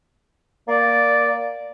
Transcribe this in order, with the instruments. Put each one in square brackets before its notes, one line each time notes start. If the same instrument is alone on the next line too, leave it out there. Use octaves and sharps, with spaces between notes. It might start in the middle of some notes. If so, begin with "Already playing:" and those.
[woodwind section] A#3 D5